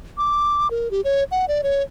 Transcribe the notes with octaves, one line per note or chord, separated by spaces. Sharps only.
D6
A#4
G4
C#5
F#5
D5
C#5